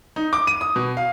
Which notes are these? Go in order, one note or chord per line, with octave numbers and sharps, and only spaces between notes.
D#4
D6
D#7
D#6
B2
F5